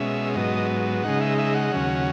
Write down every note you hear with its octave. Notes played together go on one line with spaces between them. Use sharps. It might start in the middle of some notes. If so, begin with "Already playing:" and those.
Already playing: B2 G#3 C#4 E5
G#2 F#3 B3 D#5
C#3 G#3 D#4 F#5
E5
E5
F#5
D#2 C#3 F#3 C#4